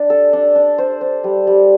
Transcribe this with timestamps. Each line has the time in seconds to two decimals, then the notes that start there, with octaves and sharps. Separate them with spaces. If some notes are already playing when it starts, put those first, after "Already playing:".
Already playing: D4
0.10 A4
0.33 D4
0.55 D4
0.78 C5
1.01 C5
1.24 G3
1.47 G3